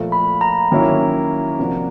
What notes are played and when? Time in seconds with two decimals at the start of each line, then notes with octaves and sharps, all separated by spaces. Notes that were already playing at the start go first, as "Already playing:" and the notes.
Already playing: A#2 F3 A3
0.12 B5
0.41 A#5
0.72 D#3 F#3 A#3 C#4 E4
1.59 C3 F3 A#3 D4 F#4